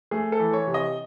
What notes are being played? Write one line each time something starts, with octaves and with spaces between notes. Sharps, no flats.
A3 G#4
A4
E3
C#5
C3
D#5